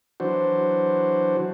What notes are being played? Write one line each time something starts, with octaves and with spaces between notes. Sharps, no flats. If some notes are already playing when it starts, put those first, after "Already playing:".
E3 F#3 D4 F#4 C5